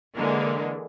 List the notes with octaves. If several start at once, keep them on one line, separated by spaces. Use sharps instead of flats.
D3 E3 G#3 A#3